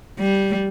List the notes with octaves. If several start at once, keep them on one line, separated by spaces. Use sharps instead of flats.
G3